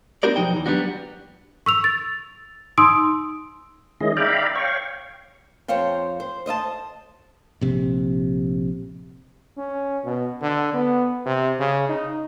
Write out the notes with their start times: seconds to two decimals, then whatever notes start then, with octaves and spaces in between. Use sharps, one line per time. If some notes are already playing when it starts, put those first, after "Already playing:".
0.23 B3 D4 F#4 G4 A#4 D5
0.36 B1 F2 F3 D#4 G5
0.54 D#2 E3
0.66 F#3 G3 A#3 B3 D4 F#4
1.66 C#6 E6 F7
1.84 A6
2.78 D#4 C6 D#6 E6 D7
4.01 D#3 G#3 C#4 E4 G#4 D#5
4.17 D5 E5 F5 G5 A#5 B5
4.55 C#5 F5 G5 C#6
5.68 F2 C5 C#5 F5 G5
6.20 C5
6.46 C5 D#5 E5 A5
7.61 A#1 C3
9.57 C#4
10.04 B2
10.41 D3
10.74 B3
11.26 C3
11.59 C#3
11.89 D#4